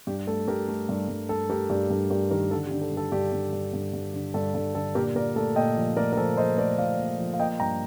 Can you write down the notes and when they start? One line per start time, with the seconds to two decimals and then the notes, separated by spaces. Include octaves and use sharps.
0.07 G2 G4
0.27 A3 A4
0.48 G2 G4 A#4
0.68 A3
0.89 G2
1.09 G2
1.29 G2 A4
1.50 A3 G4 A#4
1.70 G2 G4
1.90 G2 A4
2.11 G2 G4 A#4
2.31 D#3 G4 A#4
2.51 D3 A4
2.67 G4
2.71 D3
2.82 A4
2.92 G2
2.97 A4
3.12 G2 G4
3.32 G2
3.53 G2
3.73 G2
3.93 G2
4.14 D3
4.34 G2 A4
4.54 G2 A4
4.75 D3 A4
4.95 A#2 G4 A#4
5.15 A#2 A#4 D5
5.36 A3 A4
5.56 A#2 D#5 G5
5.77 F3
5.97 A3 A#4 D5
6.13 A#4
6.17 F3 A4 C5
6.37 F3 C5 D#5
6.58 A3 A#4 D5
6.78 A#2 D5 F5
6.99 A#2
7.19 F3
7.33 F5
7.39 A#3 D#5 G5
7.59 G2 G5 A#5